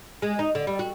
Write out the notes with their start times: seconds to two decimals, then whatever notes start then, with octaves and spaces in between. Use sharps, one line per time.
0.22 G#3
0.39 D#4
0.55 D3
0.67 G3
0.79 F#4